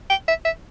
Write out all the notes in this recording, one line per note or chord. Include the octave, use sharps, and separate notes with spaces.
G5
E5
E5